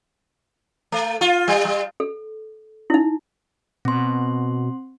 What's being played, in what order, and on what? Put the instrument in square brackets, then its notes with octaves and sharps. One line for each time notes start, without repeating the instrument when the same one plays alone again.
[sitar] A3
F4
G3
G3
[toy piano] A4
D#4 E4
[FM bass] B2 [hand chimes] C4 C6